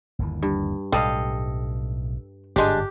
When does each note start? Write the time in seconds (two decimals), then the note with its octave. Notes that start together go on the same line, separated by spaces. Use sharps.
0.19 G1 D#2 E3
0.42 G2
0.92 B1 A2 G3 A4 D#5 F5
2.56 G1 G#2 G#3 D4 G4